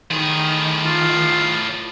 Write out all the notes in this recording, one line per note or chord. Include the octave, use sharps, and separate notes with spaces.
A2 D#3 G#4
F4